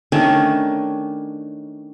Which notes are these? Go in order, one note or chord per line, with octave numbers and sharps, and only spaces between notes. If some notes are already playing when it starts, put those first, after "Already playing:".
D#3 A3 C#4 D4